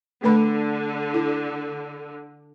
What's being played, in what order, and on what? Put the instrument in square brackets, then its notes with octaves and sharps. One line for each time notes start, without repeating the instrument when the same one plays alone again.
[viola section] D3 [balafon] A3 B4 B5
[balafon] E4